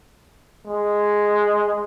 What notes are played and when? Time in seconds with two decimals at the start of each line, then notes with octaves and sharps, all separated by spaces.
0.67 G#3